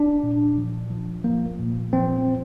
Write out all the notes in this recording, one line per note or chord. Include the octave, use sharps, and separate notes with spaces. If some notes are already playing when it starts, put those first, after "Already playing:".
Already playing: D4
A#2
F3
F3
F3 A#3
A#2
F3 C4
F3